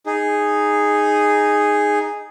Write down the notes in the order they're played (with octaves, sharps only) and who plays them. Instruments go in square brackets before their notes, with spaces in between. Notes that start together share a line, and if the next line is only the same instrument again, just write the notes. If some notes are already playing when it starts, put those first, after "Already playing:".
[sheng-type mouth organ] D#4 G#4